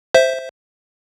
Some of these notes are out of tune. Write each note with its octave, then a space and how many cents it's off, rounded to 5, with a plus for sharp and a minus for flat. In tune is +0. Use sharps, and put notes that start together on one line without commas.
C5 +0 E5 +0